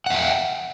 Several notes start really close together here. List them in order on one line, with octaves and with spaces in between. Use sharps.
F#5 E5 G5